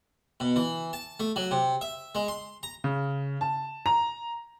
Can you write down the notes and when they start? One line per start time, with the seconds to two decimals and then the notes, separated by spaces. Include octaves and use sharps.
0.40 B2
0.56 E3
0.93 A5
1.20 A3
1.36 F#3
1.51 C3
1.81 E5
2.15 G#3
2.28 C6
2.63 A#5
2.84 C#3
3.41 A5
3.86 A#5